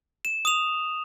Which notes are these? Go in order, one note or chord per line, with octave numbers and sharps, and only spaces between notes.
E7
D#6 F7